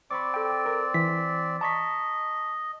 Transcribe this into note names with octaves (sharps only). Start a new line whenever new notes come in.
C4 D5 B5 C#6 D6
A4 G5
A#4
E3 B6
D#5 A5 A#5 C#6 B6